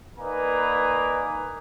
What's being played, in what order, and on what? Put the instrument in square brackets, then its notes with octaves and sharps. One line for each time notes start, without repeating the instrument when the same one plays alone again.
[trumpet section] A#3 D#4 B4 D5 G#5 A#5